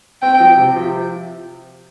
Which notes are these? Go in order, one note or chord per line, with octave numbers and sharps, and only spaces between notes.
C4 G5
F3
C3
F3